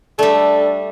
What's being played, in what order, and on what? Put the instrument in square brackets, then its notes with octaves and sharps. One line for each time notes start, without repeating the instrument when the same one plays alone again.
[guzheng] G3 A3 [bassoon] D4 [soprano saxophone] A4